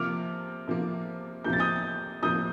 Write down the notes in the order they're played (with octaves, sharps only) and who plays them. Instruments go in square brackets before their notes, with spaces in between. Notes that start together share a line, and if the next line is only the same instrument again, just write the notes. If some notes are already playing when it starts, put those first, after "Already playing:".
Already playing: [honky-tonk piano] C3 F3 A#3 [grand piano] D6 F6
[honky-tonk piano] C3 F3 A#3
[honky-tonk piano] C3 F3 A#3 [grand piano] G6
[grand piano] A6
D#6 G6
[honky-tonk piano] C3 F3 A#3 [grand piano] D#6 G6